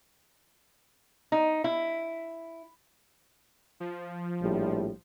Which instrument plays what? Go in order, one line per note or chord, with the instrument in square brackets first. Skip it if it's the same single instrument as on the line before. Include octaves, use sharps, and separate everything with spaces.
[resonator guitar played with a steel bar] D#4
E4
[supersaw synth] F3
[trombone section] A#1 A2 G3